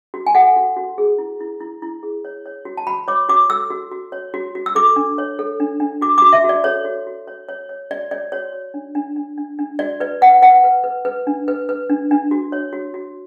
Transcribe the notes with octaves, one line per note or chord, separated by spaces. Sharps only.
F#4
G#5
A4 F#5
F#4
F#4
G#4
E4
E4
E4
E4
G#4
C#5
C#5
F#4
A5
F#4 B5
C#5 D6
F#4 D6
A4 E6
F#4
F#4
C#5
F#4
F#4
E6
A4 D6
D4
C#5
A4
D4
D4
F#4 D6
F#4 D6
E5
F#4
D5
A4 C#5
F#4
F#4
C#5
C#5
C#5
F#4 D5
C#5 D5
F#4 C#5
C#5
D4
D4
D4
D4
D4
F#4 D5
B4 D5
B4 F#5
B4 F#5
B4
B4
B4
D4
B4
B4
D4
D4
F#4
C#5
F#4
F#4